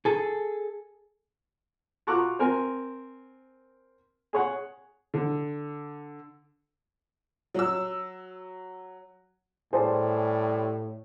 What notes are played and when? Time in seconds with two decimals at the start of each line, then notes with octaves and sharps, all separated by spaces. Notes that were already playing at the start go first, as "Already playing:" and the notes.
0.05 G#4 A4
2.07 F4 F#4 A#5 C#6 D6 F#6
2.39 C4 A#4 G#5
4.33 G#4 C#5 F#5
5.14 D3
7.54 F#3 E6
9.73 A2 G3 G#4 C5 A5